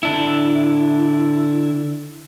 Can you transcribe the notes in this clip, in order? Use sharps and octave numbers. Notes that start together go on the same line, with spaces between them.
D3 D4 E4